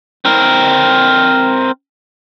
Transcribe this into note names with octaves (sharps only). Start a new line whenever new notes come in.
C4 A#4